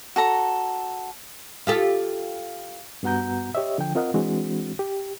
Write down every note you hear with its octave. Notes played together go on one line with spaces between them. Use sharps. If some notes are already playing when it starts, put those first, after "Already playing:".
F#4 A4 A#5
F4 G4 A4
G2 B3 F#4 F#5 A#5 G6
G4 C#5 D#5 E5
D3 F3 G5
C4 F4 A#4 D#5 F5 F#5
E3 G#3 C4 D4 F#4
G4